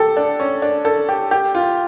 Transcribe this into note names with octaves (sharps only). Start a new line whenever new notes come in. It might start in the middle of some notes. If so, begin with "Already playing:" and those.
Already playing: G4 A4
D4
C#4
D4
A4
G4
G4
F4